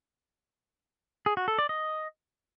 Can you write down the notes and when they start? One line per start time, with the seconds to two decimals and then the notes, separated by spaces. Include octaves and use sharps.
1.26 G#4
1.37 F#4
1.48 A4
1.58 D5
1.69 D#5